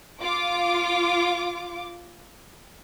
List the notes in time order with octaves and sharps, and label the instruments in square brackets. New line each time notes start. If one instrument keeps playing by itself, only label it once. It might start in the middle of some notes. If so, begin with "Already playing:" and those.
[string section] F4 D6